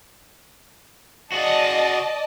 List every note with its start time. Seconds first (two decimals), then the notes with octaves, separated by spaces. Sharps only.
1.32 F#4 G#4 D5 D#5 A5